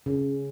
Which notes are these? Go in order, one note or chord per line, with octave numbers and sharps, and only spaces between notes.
C#3